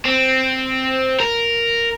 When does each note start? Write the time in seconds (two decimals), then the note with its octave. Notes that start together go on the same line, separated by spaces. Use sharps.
0.05 C4
1.20 A#4